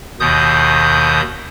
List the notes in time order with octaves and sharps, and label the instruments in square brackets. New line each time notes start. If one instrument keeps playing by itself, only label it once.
[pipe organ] D#2 B2 D#3 D#6 G6